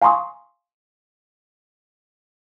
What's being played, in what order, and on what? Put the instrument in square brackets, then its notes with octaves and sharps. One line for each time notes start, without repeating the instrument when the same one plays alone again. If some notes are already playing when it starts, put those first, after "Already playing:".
[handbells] F5 G#5 A#5 C6 C#6 D#6